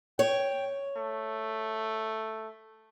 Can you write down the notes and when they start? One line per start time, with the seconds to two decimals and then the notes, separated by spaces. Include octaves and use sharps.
0.19 C#5 G5
0.97 A3